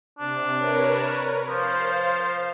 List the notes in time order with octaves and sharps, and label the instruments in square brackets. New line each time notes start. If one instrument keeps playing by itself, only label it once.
[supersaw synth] C3 [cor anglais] D4
[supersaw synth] A#4 B4 C#5
[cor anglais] F3 [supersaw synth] C5 F5